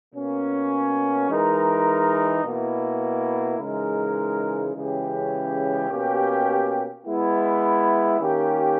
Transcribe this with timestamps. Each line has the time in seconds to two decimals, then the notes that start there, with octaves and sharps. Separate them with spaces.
0.14 B2 A#3 C#4
1.29 E3 G#3 D#4 A#4
2.43 B2 A#3 E4
3.59 C#3 E3 G#3 D#4 A#4
4.75 C#3 E3 G#3 C#4 G4
5.90 B2 A#3 C#4 G4
7.05 G#3 B3 E4
8.20 D#3 A#3 C#4 G4